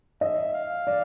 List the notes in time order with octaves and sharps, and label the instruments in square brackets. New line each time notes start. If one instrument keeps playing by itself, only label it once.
[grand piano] D#5 [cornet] E5
[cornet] F5
[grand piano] D5